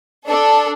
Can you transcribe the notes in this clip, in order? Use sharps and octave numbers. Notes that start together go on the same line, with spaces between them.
D4 A4